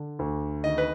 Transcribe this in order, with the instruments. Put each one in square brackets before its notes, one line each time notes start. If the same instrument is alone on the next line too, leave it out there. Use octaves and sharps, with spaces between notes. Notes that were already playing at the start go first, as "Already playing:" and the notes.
Already playing: [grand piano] D3
D2
[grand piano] D#3 [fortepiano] D#5
[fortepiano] B4